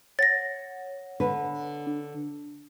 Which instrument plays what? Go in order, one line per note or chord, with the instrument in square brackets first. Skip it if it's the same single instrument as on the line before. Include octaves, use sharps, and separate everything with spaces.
[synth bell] C#5 F#5 [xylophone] A6 A#6
[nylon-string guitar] D3 B4
[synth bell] D4